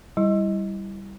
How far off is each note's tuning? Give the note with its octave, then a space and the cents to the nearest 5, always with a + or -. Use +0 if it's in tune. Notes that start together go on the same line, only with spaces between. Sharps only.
G3 +0 E4 +0